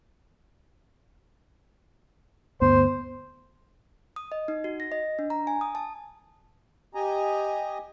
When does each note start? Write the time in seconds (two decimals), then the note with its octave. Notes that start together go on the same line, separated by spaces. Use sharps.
2.61 D2 G2 B3 C5
4.16 D#6
4.32 D#5
4.48 D#4
4.64 F#4
4.80 A#6
4.92 D#5
5.19 D4
5.30 A#5
5.47 G#5
5.61 D#6
5.75 A5
6.95 G4 D#5 G#5 A#5